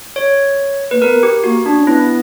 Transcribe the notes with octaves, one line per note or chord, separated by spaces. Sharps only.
C#5
A#3 B4
B3 A#4
G4
A#3 F#4
D4
C#4
B3 E4